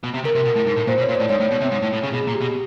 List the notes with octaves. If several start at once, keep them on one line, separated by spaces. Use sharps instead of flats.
B2
C3
C#3 A#4
C3
B2
A2
G#2
A2
A#2 C5
B2
C#5
A#2
A2 D5
G#2 C#5
A2
B2
C3
G#2
A2
A2
C#3
B2 G#4
A#2
G4
B2